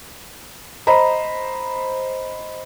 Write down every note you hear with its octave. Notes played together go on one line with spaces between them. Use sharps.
C5 D#5 A#5 B5